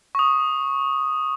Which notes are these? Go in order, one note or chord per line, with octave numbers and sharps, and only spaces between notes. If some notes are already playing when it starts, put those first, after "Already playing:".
C#6 D#6